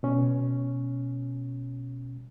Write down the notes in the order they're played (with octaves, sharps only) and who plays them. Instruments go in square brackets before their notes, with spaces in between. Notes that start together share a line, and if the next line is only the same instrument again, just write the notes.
[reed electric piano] B2 C#4